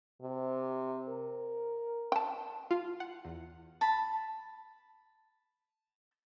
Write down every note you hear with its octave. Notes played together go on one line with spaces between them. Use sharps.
C3
A#4
G5 A5
F4
F#5
E2
A5 B5